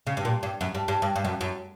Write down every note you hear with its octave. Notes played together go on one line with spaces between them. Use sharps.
C#3
G2
A#2
G2
F#2
G2
G2
G2
G2
F#2
F#2